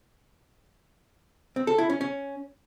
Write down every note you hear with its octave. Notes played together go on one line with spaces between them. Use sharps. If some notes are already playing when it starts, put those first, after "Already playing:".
C4
A4
E4
C#4
C#4